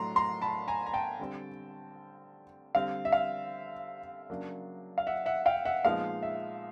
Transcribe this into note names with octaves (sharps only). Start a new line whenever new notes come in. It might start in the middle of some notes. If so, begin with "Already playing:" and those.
Already playing: A2 F#3 A3 D4 A#5 C6
A#5 C6
A5 B5
G#5 A#5
A#5
G5 A5
D3 G3 C4
D3 G3 C4 F5
E5
F5
C#3 F#3 A#3 D4
F5
E5 F#5
E5 F#5
F5 G5
E5 F#5
A#2 F3 G#3 B3 D#4 F5
E5